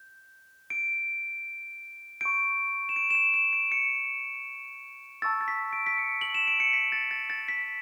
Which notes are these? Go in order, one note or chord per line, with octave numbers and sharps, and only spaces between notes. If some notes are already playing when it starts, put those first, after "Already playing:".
Already playing: G6
D7
C#6 G6 D7
E7
D7
E7
D7
E7
D7
C#7
A5 C#6 E6 A6
A6
B6
D7
B6
C#7
F#7
E7
D7
C#7
B6
A6
A6
A6
B6